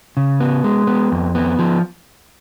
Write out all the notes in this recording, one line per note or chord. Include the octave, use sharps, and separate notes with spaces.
C#3
B3
G#3
B3
F2
B3
F3